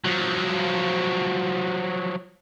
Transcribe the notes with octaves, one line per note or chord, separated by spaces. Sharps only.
F3 F#3